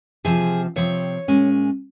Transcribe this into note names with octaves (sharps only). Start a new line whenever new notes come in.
C3 F3 C4 G#4
C3 F3 C4 C#5
A#2 G#3 C#4